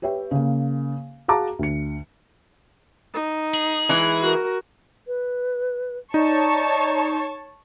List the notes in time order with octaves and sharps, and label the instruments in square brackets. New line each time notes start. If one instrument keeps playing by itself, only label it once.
[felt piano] G4 B4 C#5 E5 G5
C#3 A#3
F#4 G#4 F5 A5 A#5 D6
D2 C#7
[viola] D#4
[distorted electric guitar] G#4
[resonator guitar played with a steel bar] E3 G#3 E4
[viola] F#4 A#4
[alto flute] B4
[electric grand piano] D#4 [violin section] C#5 A5 C#6 [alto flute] D5